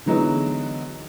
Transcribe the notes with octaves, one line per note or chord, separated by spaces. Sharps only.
D3 E3 F#3 G#3 B3 D#4